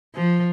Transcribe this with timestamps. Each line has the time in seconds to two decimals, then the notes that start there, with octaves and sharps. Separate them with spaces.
0.15 F3